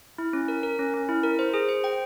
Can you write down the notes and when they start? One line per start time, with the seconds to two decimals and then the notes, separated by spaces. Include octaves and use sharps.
0.18 E4
0.33 C#4
0.48 A#4
0.63 A#4
0.79 C#4
0.94 C#4
1.09 E4
1.23 A#4
1.39 C5
1.54 G#4
1.69 C5
1.84 G5